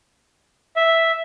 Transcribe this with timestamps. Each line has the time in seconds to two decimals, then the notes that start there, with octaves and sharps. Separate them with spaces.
0.76 E5